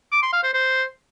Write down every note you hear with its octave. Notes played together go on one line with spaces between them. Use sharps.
D6
C6
F5
C5
C5